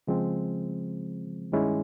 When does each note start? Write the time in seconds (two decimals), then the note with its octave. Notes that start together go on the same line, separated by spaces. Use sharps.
0.07 C#3 F3 G#3 C4
1.52 G2 D#3 G#3 C#4 E4